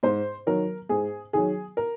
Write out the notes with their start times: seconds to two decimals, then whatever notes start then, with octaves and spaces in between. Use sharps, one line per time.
0.03 G#2 C5
0.46 D#3 F#3 A#4
0.89 G#2 G#4
1.33 D#3 F#3 G#4
1.77 A#4